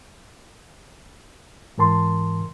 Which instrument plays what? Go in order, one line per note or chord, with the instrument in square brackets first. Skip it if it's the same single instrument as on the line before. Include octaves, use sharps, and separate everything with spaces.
[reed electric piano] G#2 E3 A#4 A5 C6